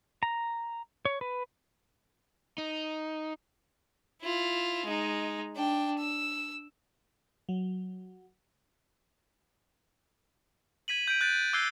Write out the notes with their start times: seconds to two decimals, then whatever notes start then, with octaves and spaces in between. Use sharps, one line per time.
0.23 A#5
1.05 C#5
1.21 B4
2.58 D#4
4.21 E4 F4
4.86 G#3 D#4
5.56 D4 G5
5.98 E6
7.49 F#3
10.88 G#6 B6 D#7 F#7
11.08 G6 D7
11.21 F#6 A6 D7
11.53 D6 E6 F#6 G#6 C7 G7